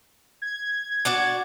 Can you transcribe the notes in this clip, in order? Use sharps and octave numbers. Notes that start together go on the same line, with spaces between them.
G#6
D4 F#4 D5